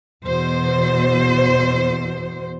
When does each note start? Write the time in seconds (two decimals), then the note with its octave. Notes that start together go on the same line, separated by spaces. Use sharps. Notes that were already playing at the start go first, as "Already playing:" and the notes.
0.25 E2 B2 C5